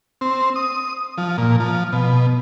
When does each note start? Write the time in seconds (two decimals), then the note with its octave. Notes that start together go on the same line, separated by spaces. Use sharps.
0.21 C4
0.56 D#6
1.18 F3
1.38 A#2
1.60 F3
1.93 B2